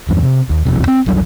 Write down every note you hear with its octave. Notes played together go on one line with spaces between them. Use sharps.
E2 G2
C3
D#2
E1 C2 F2 C3
C4
A#1 E2 F#3 G3